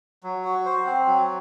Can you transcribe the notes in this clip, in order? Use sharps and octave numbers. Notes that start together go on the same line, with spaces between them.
F#3
F#4
C5
C4
F#3